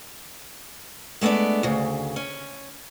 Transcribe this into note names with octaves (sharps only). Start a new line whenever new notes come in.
G#3 A3 B3 D4 D5
D2 C#3
C#4